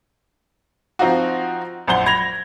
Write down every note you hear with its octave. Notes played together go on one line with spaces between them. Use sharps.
F3 C4 D#4 F4 F#4
A#1 F#2 C5 F#5 G7
B5 G#6 A#6 F7